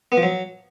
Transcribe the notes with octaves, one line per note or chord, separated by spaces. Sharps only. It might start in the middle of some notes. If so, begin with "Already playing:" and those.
B3
F3
F#3